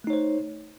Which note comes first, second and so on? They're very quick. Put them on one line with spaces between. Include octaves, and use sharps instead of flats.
A3 D#4 C#5 C5